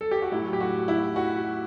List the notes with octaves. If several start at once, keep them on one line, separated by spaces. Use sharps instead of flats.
A4
G4
F#4
A2 F#3 E4
G4
F#4
E4
F#4